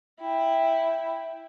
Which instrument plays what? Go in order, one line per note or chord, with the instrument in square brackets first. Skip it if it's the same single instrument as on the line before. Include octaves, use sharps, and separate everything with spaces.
[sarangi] E4 [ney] G5